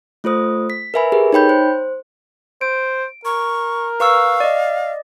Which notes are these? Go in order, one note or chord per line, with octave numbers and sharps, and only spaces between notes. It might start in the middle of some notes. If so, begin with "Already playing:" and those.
A3 F4 A4 C5 D#6
B6
A#4 B4 E5 G#5 B5
G4 G#4 A#4 B4
D#4 C#5 G5 B5 G6
C5
C5 D7
A#4 C#6
B4 F5 C#6 E6
D5 D#5